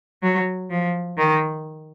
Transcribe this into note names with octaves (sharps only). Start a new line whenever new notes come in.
F#3
F3
D#3